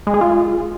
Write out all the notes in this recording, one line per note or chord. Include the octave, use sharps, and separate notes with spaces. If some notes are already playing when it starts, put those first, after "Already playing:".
G#3
G#4
F4